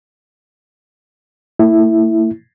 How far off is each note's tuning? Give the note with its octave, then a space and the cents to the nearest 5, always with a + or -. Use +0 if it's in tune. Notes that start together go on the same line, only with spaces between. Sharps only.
A3 +45 E4 +0